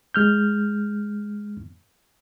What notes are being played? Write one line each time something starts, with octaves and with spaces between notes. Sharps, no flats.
G#3 F6 G6